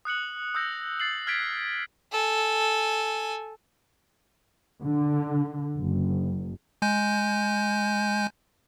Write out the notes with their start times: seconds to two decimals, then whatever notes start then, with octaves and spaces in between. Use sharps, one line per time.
0.05 D#6 F#6 C#7 F#7
0.55 D#6 E6 G6 A#6
1.00 A6 C7 F#7
1.27 F6 G#6 A6 B6 D7
2.12 A4 G#5
4.86 D3
5.77 F#1
6.82 G#3 G#5 G6